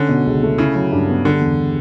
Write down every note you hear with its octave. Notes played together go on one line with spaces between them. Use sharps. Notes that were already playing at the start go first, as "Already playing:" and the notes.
Already playing: D3 C#4
B2
C#2
A3
C#3 E4
F#3
G2
B3
D3 G3
E2